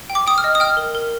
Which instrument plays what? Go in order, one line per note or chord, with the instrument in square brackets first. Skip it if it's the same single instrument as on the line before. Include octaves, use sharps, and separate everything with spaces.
[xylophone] G5
D6
G5 D#6
F6
D#5
D#6
G5 F6
A#4
A#4